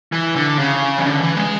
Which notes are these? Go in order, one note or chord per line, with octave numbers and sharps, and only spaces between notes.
E3
D3
C#3
E3
D3
E3
G#3